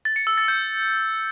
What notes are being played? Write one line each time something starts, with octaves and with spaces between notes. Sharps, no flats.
A6
C#7
E6
A6
G6